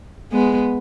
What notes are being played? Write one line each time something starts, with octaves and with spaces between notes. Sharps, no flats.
G#3 B3